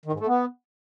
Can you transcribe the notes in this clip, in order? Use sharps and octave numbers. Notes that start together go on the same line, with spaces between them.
D#3
G#2
A3
B3